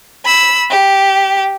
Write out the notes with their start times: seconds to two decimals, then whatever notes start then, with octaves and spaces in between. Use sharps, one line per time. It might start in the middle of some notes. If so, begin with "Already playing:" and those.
0.25 B5 E6
0.70 G4